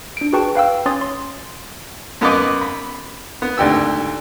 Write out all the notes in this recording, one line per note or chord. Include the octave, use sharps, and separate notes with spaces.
D4 D7
F#4 G#4 B4 G5 A5 C#6
B4 F5 G5 E6
C#4 C#5 C6 D#6 A6
C6
F#2 B3 B4 D#5 D6
B5
B3
G#1 D2 G4 E6